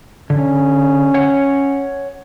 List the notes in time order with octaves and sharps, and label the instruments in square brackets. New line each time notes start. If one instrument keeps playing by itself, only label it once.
[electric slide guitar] D3 [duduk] C#4
[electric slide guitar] C#5 F#5